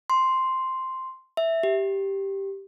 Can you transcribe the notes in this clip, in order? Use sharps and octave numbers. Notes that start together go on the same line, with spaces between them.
C6
E5
G4